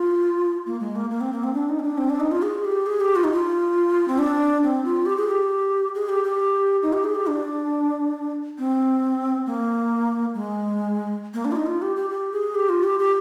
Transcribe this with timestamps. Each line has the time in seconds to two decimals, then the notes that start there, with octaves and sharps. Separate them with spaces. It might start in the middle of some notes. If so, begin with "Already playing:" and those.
Already playing: F4
0.66 A#3
0.80 G#3
0.96 A#3
1.10 A#3
1.21 C4
1.33 A#3
1.44 C4
1.54 D4
1.69 D#4
1.79 C4
1.83 D4
1.98 C4
2.10 D4
2.20 D#4
2.31 F4
2.42 G#4
2.65 G4
2.86 G#4
3.00 G4
3.15 F4
3.24 D#4
3.32 F4
4.08 C4
4.19 D4
4.63 C4
4.85 F4
5.06 G4
5.17 G#4
5.28 G4
5.95 G#4
6.09 G4
6.24 G4
6.82 D#4
6.93 G4
7.04 G#4
7.15 G4
7.27 D4
8.58 C4
9.46 A#3
10.34 G#3
11.34 A#3
11.45 D4
11.52 F4
11.56 D#4
11.66 F4
11.82 G4
11.96 G4
12.10 G4
12.32 G#4
12.55 G4
12.69 F4
12.83 G4
12.99 G4